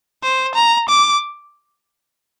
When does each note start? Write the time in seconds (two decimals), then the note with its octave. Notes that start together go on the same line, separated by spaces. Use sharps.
0.23 C5
0.55 A#5
0.89 D6